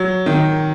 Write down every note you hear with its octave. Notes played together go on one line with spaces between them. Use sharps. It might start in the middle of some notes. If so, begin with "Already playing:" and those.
Already playing: F#3
D#3